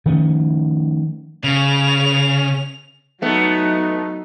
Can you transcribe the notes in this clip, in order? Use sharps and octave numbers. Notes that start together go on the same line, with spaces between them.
D#3 F3 A3 C#4
C#3 F7
F#3 A3 B3 D#4